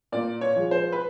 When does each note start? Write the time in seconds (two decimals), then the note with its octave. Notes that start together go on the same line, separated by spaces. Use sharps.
0.12 A#2 D5
0.41 C#5
0.56 F3 G#3
0.71 C5
0.92 B4